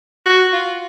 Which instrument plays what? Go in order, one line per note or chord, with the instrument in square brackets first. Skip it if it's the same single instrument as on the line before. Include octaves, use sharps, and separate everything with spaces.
[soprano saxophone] F#4
F4